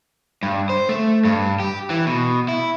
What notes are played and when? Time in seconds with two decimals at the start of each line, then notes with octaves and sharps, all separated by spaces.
0.43 G2
0.69 C5
0.89 A3
1.25 G2
1.60 G4
1.90 E3
2.06 B2
2.49 E4